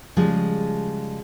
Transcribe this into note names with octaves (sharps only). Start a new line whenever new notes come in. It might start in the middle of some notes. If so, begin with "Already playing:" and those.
C#3 F3 G3 G#3